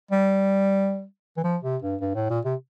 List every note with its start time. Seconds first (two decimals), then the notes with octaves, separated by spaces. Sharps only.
0.11 G3
1.37 E3
1.44 F3
1.63 C3
1.82 G2
2.01 G2
2.15 A2
2.30 A#2
2.45 C3